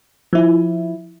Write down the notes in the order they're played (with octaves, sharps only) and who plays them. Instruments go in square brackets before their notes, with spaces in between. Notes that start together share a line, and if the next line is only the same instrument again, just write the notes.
[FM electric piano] F3 E4